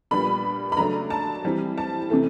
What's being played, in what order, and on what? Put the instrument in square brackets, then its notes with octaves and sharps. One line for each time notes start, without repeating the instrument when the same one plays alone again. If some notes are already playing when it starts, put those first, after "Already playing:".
[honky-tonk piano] A#2 G3 B3 D4 B5
B5
C#3 F#3 A3 D4 A#5
A5
E3 G3 C4
A5
C3 E3 A3